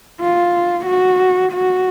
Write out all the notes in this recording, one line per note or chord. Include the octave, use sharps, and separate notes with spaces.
F4
F#4
F#4